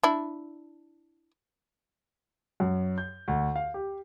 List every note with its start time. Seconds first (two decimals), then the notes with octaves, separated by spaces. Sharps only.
0.03 D4 E4
2.60 F#2
2.98 G6
3.28 D2
3.56 F5
3.74 G4